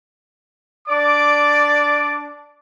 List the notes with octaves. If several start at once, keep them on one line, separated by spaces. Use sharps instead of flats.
D4 D5 D6